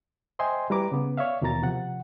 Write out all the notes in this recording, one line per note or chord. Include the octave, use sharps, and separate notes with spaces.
C5 D#5 E5 G5 G#5 C6
G3 E4 B4 A#5 D6
C#3 B3
C#5 D5 E5 F5
D#2 B2 E3 A#4 A#5 A6
C3 F3 F#5